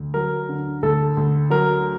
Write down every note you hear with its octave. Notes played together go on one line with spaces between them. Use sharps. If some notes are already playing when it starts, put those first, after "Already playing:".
Already playing: D2
F#3 A#4
D3
D2 A4
D2
F#3 A#4